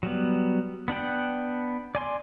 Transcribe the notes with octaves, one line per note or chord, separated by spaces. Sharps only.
F#3 G3 B3
B3 D4 F#5 G5
D5 G#5 C6